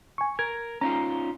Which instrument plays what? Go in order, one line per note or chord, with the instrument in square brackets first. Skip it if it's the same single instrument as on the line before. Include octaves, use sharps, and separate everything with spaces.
[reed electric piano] G#5 C#6
[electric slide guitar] A#4 [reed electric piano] G#6
[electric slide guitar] C#4 D#4 F4 [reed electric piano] A#5